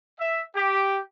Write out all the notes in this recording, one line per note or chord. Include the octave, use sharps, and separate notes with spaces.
E5
G4